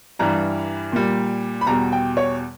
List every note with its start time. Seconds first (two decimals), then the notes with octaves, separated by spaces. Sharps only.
0.19 G2 E3 G3 A#5
0.93 A#2 G3
1.61 B5
1.66 E2 B2 G3 A#5
1.92 G5
2.17 C#5